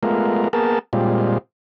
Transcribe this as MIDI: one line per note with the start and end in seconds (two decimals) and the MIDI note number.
0.03 0.48 56
0.03 0.48 57
0.03 0.48 59
0.03 0.48 65
0.03 0.48 70
0.53 0.79 58
0.53 0.79 59
0.53 0.79 68
0.53 0.79 70
0.53 0.79 81
0.93 1.38 46
0.93 1.38 55
0.93 1.38 56
0.93 1.38 60
0.93 1.38 65